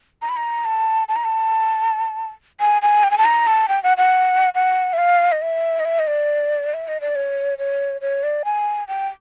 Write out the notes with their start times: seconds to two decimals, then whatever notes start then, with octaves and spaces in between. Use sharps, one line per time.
0.22 A#5
0.29 B5
0.36 A#5
0.65 A5
1.09 A5
1.16 A#5
1.24 A5
2.60 G#5
2.82 G#5
3.03 G5
3.11 G#5
3.18 A5
3.25 A#5
3.47 A5
3.68 G5
3.83 F#5
3.97 F#5
4.55 F#5
4.93 E5
4.98 F5
5.32 D#5
5.42 E5
5.80 D#5
5.85 E5
5.99 D#5
6.07 D5
6.74 E5
6.88 D#5
7.01 D5
7.15 C#5
7.59 C#5
8.01 C#5
8.23 D5
8.45 G#5
8.88 G5